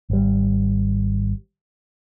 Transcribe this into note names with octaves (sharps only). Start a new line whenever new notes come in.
G#1 G3